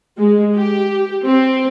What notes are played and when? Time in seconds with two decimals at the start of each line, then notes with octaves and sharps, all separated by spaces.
0.19 G#3
0.55 G4
1.24 C4